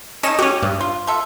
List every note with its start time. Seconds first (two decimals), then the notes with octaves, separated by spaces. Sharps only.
0.23 C#4 D#4 A4 D#5 A#6 E7
0.39 C#4 F#4 G4
0.63 G2
0.81 F4
1.07 F4 A4 E5